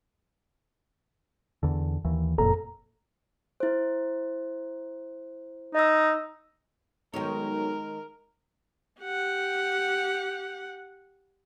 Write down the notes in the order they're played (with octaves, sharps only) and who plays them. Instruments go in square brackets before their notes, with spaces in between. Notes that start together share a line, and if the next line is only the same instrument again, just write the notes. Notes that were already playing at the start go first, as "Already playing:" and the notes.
[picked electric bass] E2 D3
D#2 E3
[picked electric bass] F#1 F2 A#2 [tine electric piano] A4 A#5
[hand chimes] E4 C5
[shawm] D#4 [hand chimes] D#5 E6
[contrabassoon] B1 [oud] D#3 G#3 C#5 [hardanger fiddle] A#4
[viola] G4 F#5